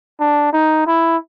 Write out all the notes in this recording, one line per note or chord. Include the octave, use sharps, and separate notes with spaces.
D4
D#4
E4